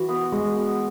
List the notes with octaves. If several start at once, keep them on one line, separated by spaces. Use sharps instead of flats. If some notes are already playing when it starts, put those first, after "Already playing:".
Already playing: E3 F#4 B4
B3
G#3 F#4
B3